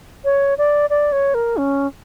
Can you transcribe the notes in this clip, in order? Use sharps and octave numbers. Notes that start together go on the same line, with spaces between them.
C#5
D5
D5
C#5
A#4
C#4